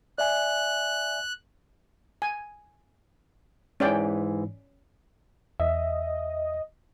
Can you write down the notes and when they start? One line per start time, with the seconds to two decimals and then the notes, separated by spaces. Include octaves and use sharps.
0.18 D5 E5 G#5 F#6
2.22 G#5
3.80 G#2 E3 C#4 D5 G5
5.60 E2 D#5 E5